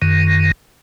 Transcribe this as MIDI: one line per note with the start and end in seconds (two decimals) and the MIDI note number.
0.02 0.51 42
0.02 0.51 51